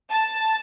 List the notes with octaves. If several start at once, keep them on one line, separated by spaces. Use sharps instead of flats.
A5